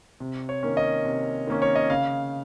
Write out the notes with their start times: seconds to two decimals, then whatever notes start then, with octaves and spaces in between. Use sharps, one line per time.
0.20 C3
0.49 C#5
0.63 D#3 A#3 C#4
0.77 D#5
1.05 C3
1.47 D#3 A#3 C#4
1.62 C#5
1.76 D#5
1.90 C#3 F5